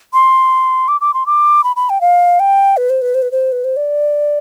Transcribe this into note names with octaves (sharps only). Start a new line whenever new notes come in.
C6
D6
D6
C6
D6
B5
B5
G5
F5
G5
B4
C5
B4
C5
B4
C5
B4
C5
D5